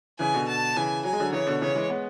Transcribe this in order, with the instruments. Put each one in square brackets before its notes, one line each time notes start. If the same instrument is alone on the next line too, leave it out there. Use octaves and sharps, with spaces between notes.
[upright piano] C#3 E3 [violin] G#5
[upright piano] B2 D3
[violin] A5
[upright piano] C#3 E3 [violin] G#5
[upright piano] F#3 [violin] G#5
[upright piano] G#3
D3 F#3
[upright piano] C#3 E3 [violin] C#5
[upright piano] B2 D3
[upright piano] C#3 E3 [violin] C#5
[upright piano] E3 G#3
G#3 B3